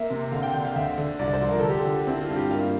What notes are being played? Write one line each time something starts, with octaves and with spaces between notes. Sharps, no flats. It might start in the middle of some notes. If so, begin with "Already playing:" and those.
Already playing: A#3 E5
C3
D3 F5
G5
D3 G5
F5
D2 E5
D3
C2 D5
C5
F3
A#4
D3 A4
G4
A4
D3
C4 E4
F4
G2
G4
A#3 F5